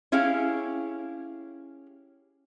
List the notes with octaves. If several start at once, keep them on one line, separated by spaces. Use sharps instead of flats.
C#4 E4 G4 G#4 F5